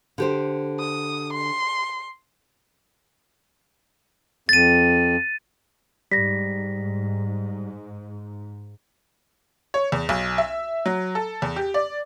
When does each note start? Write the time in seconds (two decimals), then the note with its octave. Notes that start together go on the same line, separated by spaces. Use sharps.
0.18 D3 G4 C5
0.80 D#6
1.33 C6
4.49 F2 A6 D#7
6.12 G#2 G3 A#6 B6
9.74 C#5
9.92 E2
10.09 B1
10.38 E5
10.86 F#3
11.15 A4
11.42 E2
11.56 G4
11.74 D5